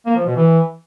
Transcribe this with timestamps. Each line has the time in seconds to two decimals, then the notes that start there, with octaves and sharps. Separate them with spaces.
0.06 A#3
0.16 F3
0.26 B2
0.36 E3